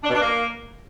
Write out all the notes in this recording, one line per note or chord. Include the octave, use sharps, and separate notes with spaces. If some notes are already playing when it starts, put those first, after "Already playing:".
D4
B2
D4
A#3